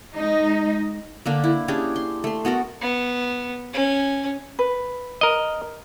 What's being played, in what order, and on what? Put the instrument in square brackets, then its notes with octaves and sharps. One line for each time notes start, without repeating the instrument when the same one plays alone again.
[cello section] G#3 D#4 D#5
[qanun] D3 A#3 D4
E4
C#4 D4 G4 G#4
C6
A3 C6
B3 F#4 A4 A#4
[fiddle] B3
C#4
[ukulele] B4
[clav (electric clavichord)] A#4 D#5